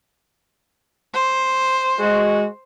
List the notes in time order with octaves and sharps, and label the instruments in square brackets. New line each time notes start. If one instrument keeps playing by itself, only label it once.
[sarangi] C5
[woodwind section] G#3 F#4